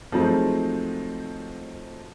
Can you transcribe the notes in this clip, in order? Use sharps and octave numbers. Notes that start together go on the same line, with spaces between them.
F3 F#3 G#3 A3 C4 D#4